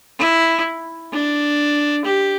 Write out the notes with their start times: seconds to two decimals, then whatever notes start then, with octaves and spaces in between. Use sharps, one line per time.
0.19 E4
1.12 D4
2.05 G4